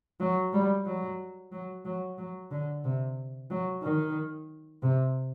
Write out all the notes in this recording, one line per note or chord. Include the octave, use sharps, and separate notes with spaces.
F#3
G3
F#3
F#3
F#3
F#3
D3
C3
F#3
D#3
C3